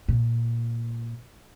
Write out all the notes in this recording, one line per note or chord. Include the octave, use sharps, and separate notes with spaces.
A#2